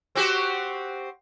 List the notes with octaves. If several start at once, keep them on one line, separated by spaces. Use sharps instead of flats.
C4 F#4 G4